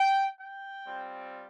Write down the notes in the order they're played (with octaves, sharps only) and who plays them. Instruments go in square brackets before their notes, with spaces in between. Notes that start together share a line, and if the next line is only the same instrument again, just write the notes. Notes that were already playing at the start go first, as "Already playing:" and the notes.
Already playing: [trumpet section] G5
G5
G3 C4 F4